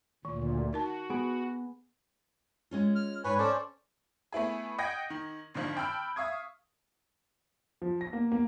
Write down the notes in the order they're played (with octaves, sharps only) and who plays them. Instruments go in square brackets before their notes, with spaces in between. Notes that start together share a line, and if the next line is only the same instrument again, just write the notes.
[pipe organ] D2 A#2 [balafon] D#3
[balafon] D#4 A#4 A5 [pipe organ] F#4
[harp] B3 G#4 D7
[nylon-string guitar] G#3 C#4 F4
[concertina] F6
[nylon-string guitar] G#2 [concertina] B4 C#5 G#5
[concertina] C#4 C5 D5 [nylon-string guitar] A4
[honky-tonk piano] A3 B3 E4 G#4
D#5 F#5 G5 G#6 A#6
D#3
G#1 D3 D#3 F3 F4
G5 A5 B5 E6 F6
E5 F5 C#6 D#6 G#6
[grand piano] F3
A#6
A#3
A#3